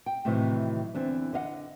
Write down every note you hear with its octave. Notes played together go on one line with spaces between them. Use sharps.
G5
A2 C3 D#3 E3 F#3
E2 D3 E3 C4 D4
D3 D#5 F5 F#5